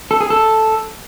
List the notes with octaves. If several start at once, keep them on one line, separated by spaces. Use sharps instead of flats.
A4
G#4
A4